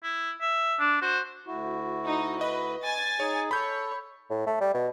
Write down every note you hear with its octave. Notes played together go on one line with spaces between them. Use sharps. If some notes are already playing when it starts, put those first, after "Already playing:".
E4
E5
D4
F#4 C5
D2 E4 F#4
D#4
B4 D#5
G#5 A6
D#4 G#4 C#5
A4 C#5 B5 G6
A2
A3
G3
B2